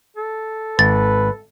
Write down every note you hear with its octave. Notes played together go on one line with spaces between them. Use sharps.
A4
G#1 B4 A6